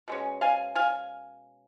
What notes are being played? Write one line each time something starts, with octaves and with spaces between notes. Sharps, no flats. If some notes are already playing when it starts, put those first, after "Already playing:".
B2 G#3 C#4
F5 G#5
F5 G#5